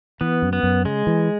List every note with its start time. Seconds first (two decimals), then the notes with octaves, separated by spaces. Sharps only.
0.21 E3 B3
0.42 F#2
0.53 B3
0.63 F#2
0.85 C#3 G#3
1.07 E3